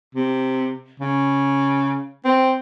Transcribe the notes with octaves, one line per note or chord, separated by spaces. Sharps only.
C3
C#3
C4